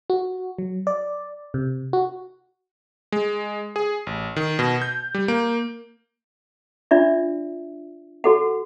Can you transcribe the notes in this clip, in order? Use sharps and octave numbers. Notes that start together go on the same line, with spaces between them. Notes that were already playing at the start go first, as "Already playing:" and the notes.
F#4
F#3
D5
C3
F#4
G#3
G#4
A1
D#3
B2
G6
G3
A#3
D4 F4 D5 E5
F#4 A4 F#5